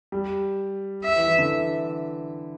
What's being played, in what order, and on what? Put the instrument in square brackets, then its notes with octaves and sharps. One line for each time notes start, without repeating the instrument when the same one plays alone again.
[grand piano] G3
[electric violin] E5
[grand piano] E3
E3
D3